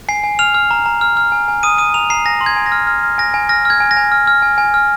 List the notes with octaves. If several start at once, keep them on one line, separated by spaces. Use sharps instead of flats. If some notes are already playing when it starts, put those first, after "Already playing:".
G#5 C7
G#5
F6 F7
F6
A#5
A#5
F6
F6
G#5
G#5
D#6 D#7
D#6 D#7
A#5 F7
A#5 C7
G#5 A#6
C6
G#6
G#5
A#6
F6
F6
F6
G#5 A#6
G#5
F6 A#6
F6 G#6
G#5
A#6
G#5
F6
F6
G#5
G#5
F6